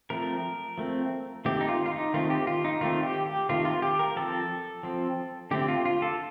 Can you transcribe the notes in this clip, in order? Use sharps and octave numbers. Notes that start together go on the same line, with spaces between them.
F3 A3 C4 A#4
F3 A3 C4
D#3 A3 C4 G4
D#4
F4
F4
D#4
D#3 A3 C4 F4
G4
F4
D#4
D#3 A3 C4 F4
G4
G4
D#3 A3 C4 F4
F4
G4
A#4
F3 C4 A4
F3 C4
D3 A3 C4 G4
F4
F4
A4